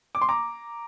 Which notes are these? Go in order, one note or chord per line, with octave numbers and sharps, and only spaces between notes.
D6
C6
A#5 D6